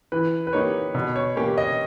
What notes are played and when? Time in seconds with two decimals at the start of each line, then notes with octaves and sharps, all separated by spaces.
0.12 E3 B4
0.47 B4
0.53 A#3 D#4 G4 C#5
0.94 B2
1.16 C#5
1.36 A#3 C#4 G4 C#5
1.58 D#5